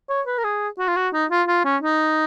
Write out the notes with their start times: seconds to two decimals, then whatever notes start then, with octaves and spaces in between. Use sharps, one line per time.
0.09 C#5
0.27 B4
0.38 A#4
0.44 G#4
0.79 F#4
0.88 F4
0.96 F#4
1.13 D#4
1.31 F4
1.48 F4
1.65 C#4
1.83 D#4